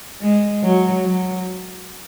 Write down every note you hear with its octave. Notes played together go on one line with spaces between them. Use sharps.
G#3
F#3
F#3